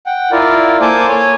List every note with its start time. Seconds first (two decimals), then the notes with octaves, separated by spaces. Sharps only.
0.06 F#5 G5
0.32 E4 F4 A#4 D5
0.81 A#3 A4 C5 G#5 A5 D6
1.08 C#5 G#5